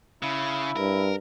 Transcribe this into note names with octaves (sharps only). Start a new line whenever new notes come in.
C#3 E4
G2 A#4